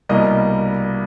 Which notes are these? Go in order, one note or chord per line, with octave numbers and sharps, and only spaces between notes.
C2 B2 G3 A#3 D#5